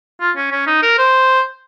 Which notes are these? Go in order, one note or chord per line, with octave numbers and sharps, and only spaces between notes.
F4
C#4
C#4
D#4
A#4
C5